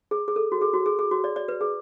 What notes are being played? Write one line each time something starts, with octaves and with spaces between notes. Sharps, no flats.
G#4
G#4
A4
F#4
G#4
F#4
G#4
G#4
F#4
D5
D5
B4
G#4